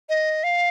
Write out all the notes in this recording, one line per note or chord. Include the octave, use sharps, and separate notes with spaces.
D#5
F5